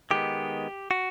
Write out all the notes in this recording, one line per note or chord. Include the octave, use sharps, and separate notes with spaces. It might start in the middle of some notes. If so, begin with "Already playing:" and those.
D#3 G#3 B3 G4
F#4